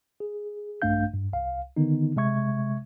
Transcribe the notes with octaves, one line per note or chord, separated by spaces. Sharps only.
G#4
A#1 G2 A3 D4 F5 G6
G2
C2 F5
D3 D#3 B3 D#4
C3 G#3 E5 C#6 G#6